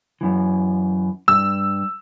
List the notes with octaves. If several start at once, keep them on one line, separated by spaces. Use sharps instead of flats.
F#2 E3
G2 E6